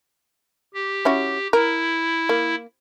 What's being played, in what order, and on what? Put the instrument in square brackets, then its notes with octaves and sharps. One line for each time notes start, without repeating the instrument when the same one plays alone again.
[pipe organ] G4
[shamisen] C#4 E4 F#4
[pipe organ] E4 [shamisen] A#4
[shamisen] A#3